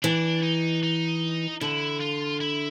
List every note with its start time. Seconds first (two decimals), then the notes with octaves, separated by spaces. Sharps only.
0.03 E3 D4
0.43 D#4
0.83 D#4
1.61 D3 E4
2.01 F4
2.40 E4